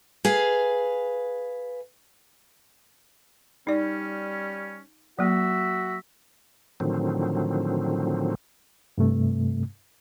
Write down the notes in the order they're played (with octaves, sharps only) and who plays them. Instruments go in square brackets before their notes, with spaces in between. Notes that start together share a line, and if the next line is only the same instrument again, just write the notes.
[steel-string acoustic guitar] G#4 B4 F5
[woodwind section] G3 C#4 [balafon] D#4 D5
[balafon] F#3 A#3 [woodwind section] F#4 E5
[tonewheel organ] A2 D3 D#3 F3 F#3 C4
[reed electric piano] G2 C3 A3